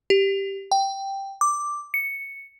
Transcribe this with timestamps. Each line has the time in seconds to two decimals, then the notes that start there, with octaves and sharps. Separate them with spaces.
0.10 G4
0.72 G5
1.41 D6
1.94 C#7